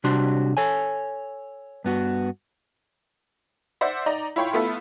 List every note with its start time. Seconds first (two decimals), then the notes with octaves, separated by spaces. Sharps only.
0.04 C3 G3 D4 F#4 C6
0.57 A4 C#5 G#5
1.84 G2 B3 F#4
3.81 C5 D5 E5 F#5
4.06 D#4 D5 A#5
4.36 E4 F4 C#5 G5 C6
4.53 A3 B3 E4 F4 A4 E5